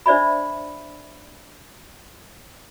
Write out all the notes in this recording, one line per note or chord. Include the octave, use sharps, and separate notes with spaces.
D4 C5 D5 E5 B5